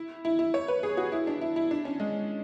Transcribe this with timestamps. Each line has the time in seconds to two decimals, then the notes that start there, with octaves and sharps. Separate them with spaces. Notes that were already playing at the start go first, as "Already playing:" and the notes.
Already playing: E4
0.25 E4
0.39 E4
0.54 C#5
0.68 B4
0.83 G#4
0.97 F#4
1.12 E4
1.27 D4
1.41 E4
1.56 E4
1.71 D4
1.85 C#4
2.00 G#3